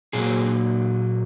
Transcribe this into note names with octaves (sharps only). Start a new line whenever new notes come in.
A#2 F#3 A#3 G#4